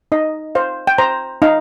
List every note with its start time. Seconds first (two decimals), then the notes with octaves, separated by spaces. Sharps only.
0.12 D#4 D#5
0.55 C5 F5
0.87 G5
0.98 C5 A#5
1.42 D#4 F5